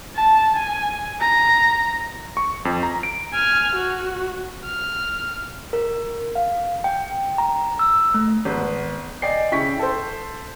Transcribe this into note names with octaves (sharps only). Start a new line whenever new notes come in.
A5
G#5
A#5
C#6
F2
A#5
D7
G#5 F6
F#4
F6
A#4
F5
G5
A#5
E6
A3
G#1 B3
D5 D#5 G5 G#5 C7
C#3 E4 G5 C#6 B6
A4 C5